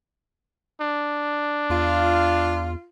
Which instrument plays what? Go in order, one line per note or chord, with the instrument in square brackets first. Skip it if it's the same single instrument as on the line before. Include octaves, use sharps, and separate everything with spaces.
[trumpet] D4
[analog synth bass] E2 [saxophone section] F4